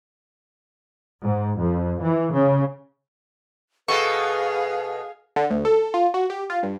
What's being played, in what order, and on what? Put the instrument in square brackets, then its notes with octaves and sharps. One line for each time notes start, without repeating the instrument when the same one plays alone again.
[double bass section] G#2
F2
E3
C#3
[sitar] B2 B3 A4 [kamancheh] G#4 F5 [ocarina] B4 [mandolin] C#6
[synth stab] D3
D2
A4
F4
F#4
G4
F4
G2